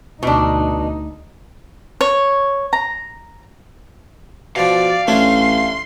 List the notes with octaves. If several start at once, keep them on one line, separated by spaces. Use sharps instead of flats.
D2 B2 D4 D#4
C#5
A#5
B2 F3 D5 F5
A1 A3 C#4 D4 C6